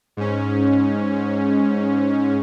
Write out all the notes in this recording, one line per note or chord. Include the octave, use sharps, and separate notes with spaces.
G#2 C#4